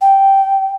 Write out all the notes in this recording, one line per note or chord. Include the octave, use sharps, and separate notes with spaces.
G5